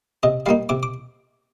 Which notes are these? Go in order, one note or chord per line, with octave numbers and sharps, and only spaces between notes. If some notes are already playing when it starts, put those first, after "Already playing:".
C3 D#5
G3 A#3 D#4 F5
C3 D6
D6